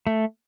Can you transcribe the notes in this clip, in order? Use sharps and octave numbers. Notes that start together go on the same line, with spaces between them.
A3